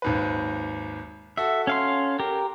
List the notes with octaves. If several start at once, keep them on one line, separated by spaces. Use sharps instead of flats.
G#1 D#2 B4
F#4 A4 E5
C#4 F5 C6
G4 A#4